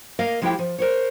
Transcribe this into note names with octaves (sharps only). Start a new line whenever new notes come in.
A#3 A#4 D#5 F5
F3 G#3 E4 G4 A4 G5
F3
A#4 C5 C#5